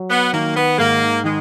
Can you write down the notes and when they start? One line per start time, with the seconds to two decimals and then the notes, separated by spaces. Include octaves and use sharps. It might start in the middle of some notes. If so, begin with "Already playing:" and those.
Already playing: F#3
0.10 B3
0.33 D#3 A#3
0.56 B3
0.78 G#2 A#3
1.24 D#3 G#3